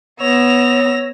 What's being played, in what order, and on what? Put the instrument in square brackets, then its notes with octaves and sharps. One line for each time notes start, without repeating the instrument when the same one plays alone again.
[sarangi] B3 [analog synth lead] C#5 [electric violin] E6 A#6 [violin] F7